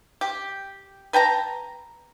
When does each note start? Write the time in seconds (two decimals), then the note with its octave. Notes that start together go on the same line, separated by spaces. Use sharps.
0.21 G4
1.13 B4 G5 A5 A#5